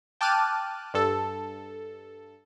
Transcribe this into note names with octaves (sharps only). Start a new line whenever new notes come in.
G5 A5 D6 F6 F#6 D#7
G2 A4